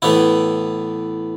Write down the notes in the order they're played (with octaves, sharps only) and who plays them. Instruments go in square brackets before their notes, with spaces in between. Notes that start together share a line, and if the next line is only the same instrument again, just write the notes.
[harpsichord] A2 E3 B3 E4